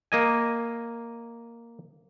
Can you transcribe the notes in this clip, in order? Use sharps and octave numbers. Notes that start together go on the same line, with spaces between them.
A#3 D#5 G#5